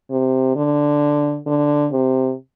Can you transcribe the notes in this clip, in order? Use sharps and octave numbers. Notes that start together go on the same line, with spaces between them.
C3
D3
D3
C3